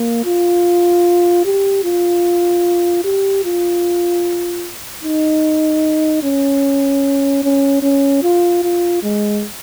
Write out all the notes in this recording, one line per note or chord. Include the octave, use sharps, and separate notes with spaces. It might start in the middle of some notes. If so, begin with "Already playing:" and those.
Already playing: A#3
F4
G4
F4
G4
F4
D#4
C#4
C#4
C#4
F4
F4
G#3